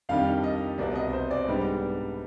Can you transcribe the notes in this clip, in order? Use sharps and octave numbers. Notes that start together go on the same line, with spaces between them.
F2 D#3 G3 D4 F5
D#5
C2 B2 B3 D5
D#5
C5
D5
G#2 G3 B3 D4